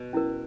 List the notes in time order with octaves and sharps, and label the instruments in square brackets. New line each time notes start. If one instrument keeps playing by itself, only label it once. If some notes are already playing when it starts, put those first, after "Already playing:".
Already playing: [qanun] B2
[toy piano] C#4 E4 A#4